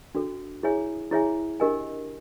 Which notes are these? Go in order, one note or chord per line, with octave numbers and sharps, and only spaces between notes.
D4 F#4 A4
E4 G#4 C#5 E5 G#5
E4 G#4 C#5 E5 G#5
D4 G4 A#4 D#5 G#5